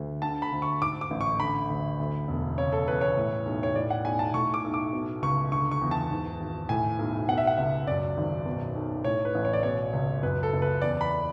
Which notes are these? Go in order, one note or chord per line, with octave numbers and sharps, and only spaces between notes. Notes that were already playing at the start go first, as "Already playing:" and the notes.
Already playing: D2
D3 A5
B5
D2
C#6
G#2 D6
D6
A1
C#6
D3 B5
D2
D2
E1
C#3 C#5
A4
E2 B4
C#5
A2
B1
C#5
A2 D5
F#5
B1 G#5
A5
A2 C#6
D6
B1
D6
B2
C#2 C#6
D3 C#6
C#6
E2
A5
G#2
G#1
A2 G#5
B1
B2 F#5
E5
F#5
C#2 E5
F#2 D5
G#1
B2
B1
A2 C#5
B4
A1
C#5
D5
B2 C#5
C#2
F#2 B4
A4
F#1
B4
E2 D5
B5